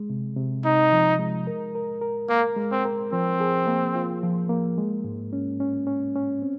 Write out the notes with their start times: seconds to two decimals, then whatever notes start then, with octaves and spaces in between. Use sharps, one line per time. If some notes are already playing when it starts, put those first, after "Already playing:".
Already playing: G#3
0.10 C3
0.37 C3
0.65 C3 D#4
0.92 F3
1.19 G#3
1.47 A#4
1.75 A#4
2.01 A#4
2.29 A#3 A#4
2.57 G#3
2.71 C4
2.85 A#4
3.13 F3 C4
3.40 G#4
3.67 A#3
3.95 F4
4.23 F3
4.49 A#3
4.78 G#3
5.04 G#2
5.33 C#4
5.60 C#4
5.87 C#4
6.15 C#4
6.42 C4